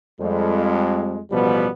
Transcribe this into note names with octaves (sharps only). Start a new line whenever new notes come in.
F2 G3 G#3
A1 B2 F3 G3 B3 B4